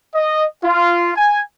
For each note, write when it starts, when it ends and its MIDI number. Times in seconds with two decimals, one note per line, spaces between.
0.14 0.44 75
0.63 1.11 65
1.15 1.40 80